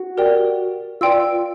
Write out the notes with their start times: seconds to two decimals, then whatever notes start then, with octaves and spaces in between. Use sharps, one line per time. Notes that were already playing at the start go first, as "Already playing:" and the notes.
Already playing: F#4
0.17 G4 A#4 D5 G5
1.01 F4 B4 D5 G5 C6 E6